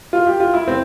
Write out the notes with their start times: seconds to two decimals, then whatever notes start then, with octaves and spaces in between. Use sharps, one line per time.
0.13 F4
0.27 G4
0.40 F4
0.54 E4
0.68 C4